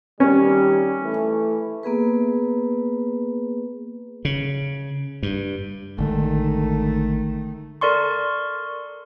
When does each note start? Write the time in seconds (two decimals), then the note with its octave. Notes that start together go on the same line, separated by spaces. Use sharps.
0.20 D#3 G3 C#4
1.03 E3 A3
1.83 A#3 B3 G#4 B4
4.25 C#3
5.23 G2
5.98 A1 D3 D#3 G#3 A3
7.81 A4 A#4 D5 C6 C#6